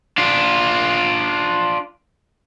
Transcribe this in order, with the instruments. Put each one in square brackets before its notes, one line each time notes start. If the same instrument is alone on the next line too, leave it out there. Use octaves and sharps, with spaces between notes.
[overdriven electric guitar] D4 F4